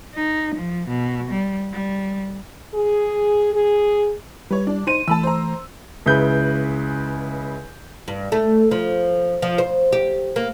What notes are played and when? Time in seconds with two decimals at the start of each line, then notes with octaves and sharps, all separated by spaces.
0.15 D#4
0.55 F3
0.89 B2
1.31 G3
1.73 G3
2.74 G#4
3.54 G#4
4.51 G3 B4 C#5
4.67 D4
4.87 D#4 C5 D#7
5.08 E3 A3 A5 B5 E6
5.23 C5 A#5
6.06 C#2 C#3 E4 B4 G6
8.08 G2
8.32 A3
8.71 F3
9.42 F3
9.58 C5
9.93 G4
10.36 A#3